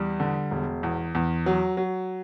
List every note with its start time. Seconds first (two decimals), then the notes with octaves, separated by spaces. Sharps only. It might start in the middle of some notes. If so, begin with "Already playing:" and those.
Already playing: E2 G3
0.20 D3
0.51 E1
0.83 E2
1.15 E2
1.46 F#3
1.77 F#3